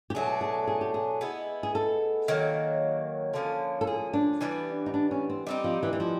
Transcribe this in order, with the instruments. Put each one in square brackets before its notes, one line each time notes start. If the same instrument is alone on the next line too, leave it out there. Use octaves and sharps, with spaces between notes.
[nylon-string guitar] G4
[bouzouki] B2 F#3 A3 D4 [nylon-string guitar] G#4
[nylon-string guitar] G#4
G#4
G4
G#4
[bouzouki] G#3 B3 E4
[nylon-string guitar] G#4
A4
[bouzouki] D#3 F#3 A#3
D3 F3 A#3 C#4
[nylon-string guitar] A4
G#4
D4
[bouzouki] E3 G3 B3
[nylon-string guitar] D#4
D4
C#4
C4
[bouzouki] G3 C4 D#4 G4
[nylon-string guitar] F3
E3
E3
F3